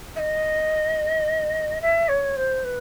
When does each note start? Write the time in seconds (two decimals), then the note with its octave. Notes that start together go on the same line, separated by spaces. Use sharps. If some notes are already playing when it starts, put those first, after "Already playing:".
0.15 E5
0.18 D#5
1.81 E5
2.08 C#5
2.36 C5
2.63 B4